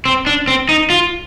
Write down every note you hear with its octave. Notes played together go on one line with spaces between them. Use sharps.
C4
D4
C4
D#4
F4